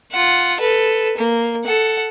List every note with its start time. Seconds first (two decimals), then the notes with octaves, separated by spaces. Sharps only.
0.13 F4 F#5
0.60 A4 B4
1.17 A#3
1.65 A4 F#5